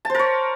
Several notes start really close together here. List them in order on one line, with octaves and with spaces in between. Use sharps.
A5 C5 A#4 C#5